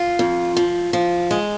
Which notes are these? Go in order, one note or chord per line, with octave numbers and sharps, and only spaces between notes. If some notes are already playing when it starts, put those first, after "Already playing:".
Already playing: F4
F2
F3
F3
G#3